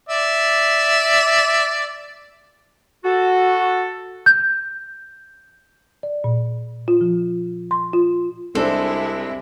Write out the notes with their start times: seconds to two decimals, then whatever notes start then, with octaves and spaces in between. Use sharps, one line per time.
0.09 D5 E5
3.04 F#4 A4
4.26 G6
6.03 D5
6.24 A#2
6.88 F4
7.01 F3
7.71 C6
7.93 F4
8.55 C2 C3 G#3 C4 D4 E4 A4